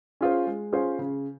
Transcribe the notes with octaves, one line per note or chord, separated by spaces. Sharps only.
C#4 F4 G#4 C5
G#3
C#4 F4 G#4 C5
C#3